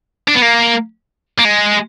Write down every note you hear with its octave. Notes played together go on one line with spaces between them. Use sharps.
D4
B3
A#3
A#3
G#3